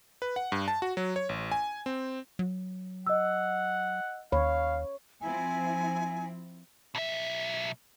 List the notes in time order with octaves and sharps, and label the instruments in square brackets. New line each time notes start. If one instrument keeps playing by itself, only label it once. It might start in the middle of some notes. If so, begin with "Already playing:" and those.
[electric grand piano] B4
F#5
G2
A5
F#4
F#3
C#5
A1
G#5
C4
[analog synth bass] F#3
[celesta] D#5 E6 [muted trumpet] F#5
[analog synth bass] D#2 [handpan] C#5 [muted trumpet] F5 [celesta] B5
[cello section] F3 C4 E4 [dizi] G#5
[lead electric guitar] B1 E5